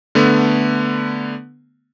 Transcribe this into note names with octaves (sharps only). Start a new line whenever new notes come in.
D3 A3 B3